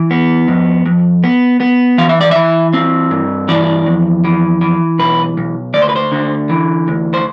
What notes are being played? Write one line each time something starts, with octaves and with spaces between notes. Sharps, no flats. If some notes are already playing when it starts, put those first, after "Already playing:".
Already playing: E3
B3
F2
F2
B3
B3
E3 F5
E5
D5
E3 E5
C4
G2
E3 D5
F2
E3
E3
B1 B4
B1
D2 D5
C5
B4
C5
D3
E3
D2
C5